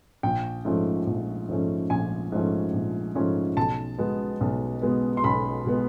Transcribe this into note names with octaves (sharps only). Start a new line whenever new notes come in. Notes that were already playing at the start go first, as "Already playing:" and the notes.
A#1 G5
G#2 F3 A3 C#4
A#1
G#2 F3 A3 C#4
A#1 G#5
G#2 F3 A3 C#4
A#1
G#2 F3 A3 C#4
B1 A5
B2 G#3 B3
B1
B2 G#3 B3
C6
B1 B5
B2 G#3 B3